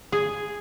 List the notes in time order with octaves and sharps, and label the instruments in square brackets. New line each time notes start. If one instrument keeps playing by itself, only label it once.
[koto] G#4